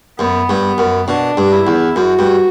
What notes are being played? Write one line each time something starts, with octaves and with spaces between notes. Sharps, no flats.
F#2 B3
G2
B3
F#2
B2 D4
G2
E4
E2
F#2 F#4
G2